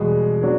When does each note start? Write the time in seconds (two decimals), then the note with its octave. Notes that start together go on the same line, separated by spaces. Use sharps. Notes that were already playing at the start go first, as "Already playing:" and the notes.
Already playing: E2 B2 G3 G#3
0.42 F#3 B3 D4 F#4